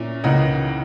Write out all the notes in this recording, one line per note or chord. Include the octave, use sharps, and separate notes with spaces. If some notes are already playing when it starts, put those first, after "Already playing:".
Already playing: A#2 A#3 C#4 E4
C#2 C#3 E3 A#3 D#4 D#5 F#5